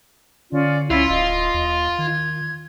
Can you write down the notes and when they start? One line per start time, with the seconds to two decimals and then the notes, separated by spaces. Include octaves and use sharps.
0.52 D3 C#4 F4 D5
0.90 C#2 C#4 E4 F4
1.09 D1 D#5
1.54 D#2
1.98 D#3 G#6